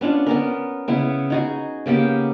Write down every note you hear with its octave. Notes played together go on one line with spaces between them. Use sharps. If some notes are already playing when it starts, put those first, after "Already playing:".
B3 C#4 D4 F4
B3 C#4 A#4
C#3 B3 E4
D#4 F#4 G#4
C#3 A#3 B3 G4